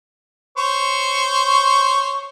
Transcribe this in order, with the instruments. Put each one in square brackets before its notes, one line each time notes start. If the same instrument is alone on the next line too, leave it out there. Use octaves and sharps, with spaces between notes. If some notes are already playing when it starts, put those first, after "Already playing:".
[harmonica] C5 C#5 C#6